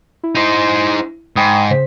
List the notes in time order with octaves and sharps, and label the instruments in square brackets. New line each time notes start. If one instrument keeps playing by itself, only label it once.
[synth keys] E4
[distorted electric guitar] D#4 C5
[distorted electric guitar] G#2 [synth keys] G5 B5 D#6
[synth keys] C#3 C5 B6